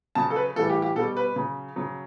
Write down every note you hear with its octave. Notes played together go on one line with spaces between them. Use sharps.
C#3 F#3 A5
A4
B4
A2 E3 G3 A4
G4
G4
B2 G3 A4
B4
C#3 F#3
C#3 F#3